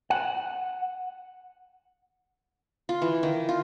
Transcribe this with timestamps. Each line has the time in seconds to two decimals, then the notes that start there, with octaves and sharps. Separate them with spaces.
0.10 F#5
2.89 F4
3.02 E3
3.23 D#3
3.49 F4